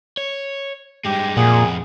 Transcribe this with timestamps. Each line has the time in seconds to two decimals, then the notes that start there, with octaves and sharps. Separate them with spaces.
0.17 C#5
1.05 G2 G#3 G4
1.37 F2 A#2 G#4 F#5